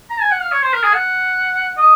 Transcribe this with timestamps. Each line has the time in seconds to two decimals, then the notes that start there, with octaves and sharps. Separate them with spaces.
0.10 A#5
0.21 G#5
0.31 F#5
0.41 F5
0.52 C#5
0.62 C5
0.73 A#4
0.83 G#4
0.94 F#5
1.77 D#5